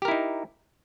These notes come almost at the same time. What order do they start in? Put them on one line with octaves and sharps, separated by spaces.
G4 A#4 E4 D#4